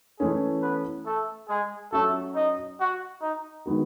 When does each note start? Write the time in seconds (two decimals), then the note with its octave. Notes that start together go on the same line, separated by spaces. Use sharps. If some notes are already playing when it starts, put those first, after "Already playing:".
0.20 E3 G#3 A3 C#4 G#4
0.63 B3 B4
1.06 A3 A4
1.50 G#3 G#4
1.92 F#3 A3 C#4 F#4 A4
2.36 D#4
2.79 F#4
3.22 D#4
3.66 D#3 G#3 B3 F#4